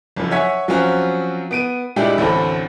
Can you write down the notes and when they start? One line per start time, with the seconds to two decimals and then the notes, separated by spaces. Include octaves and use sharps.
0.16 F#1 F2
0.31 C#5 E5 F#5 G#5 G#6 B6
0.68 F3 F#3 C4 C#4 F4 F#4
1.51 B3 D7 D#7
1.96 A#2 G3 G#3 D4 E4 G4
2.18 A1 D2 C4 A4 B5